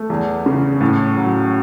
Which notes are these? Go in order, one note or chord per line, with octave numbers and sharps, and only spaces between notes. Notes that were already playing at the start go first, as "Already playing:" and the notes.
Already playing: A3
E2
C#3
A2
F#3